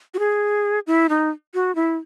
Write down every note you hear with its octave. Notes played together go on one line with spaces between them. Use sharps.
F#4
G#4
E4
D#4
F#4
E4